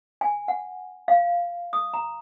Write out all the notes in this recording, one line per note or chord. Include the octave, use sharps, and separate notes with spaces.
G#5
F#5
F5
D#6
A#5